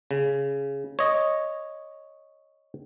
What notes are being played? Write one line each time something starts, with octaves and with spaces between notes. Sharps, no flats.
C#3
C#5 D#5